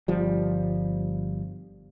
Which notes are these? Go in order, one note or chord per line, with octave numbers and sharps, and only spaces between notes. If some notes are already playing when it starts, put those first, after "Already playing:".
G1 F3 G3